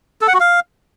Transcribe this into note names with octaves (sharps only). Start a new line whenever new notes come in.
A4
F#5
F#4
F5